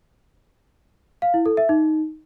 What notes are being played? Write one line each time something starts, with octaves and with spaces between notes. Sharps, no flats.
F5
E4
A4
E5
D#4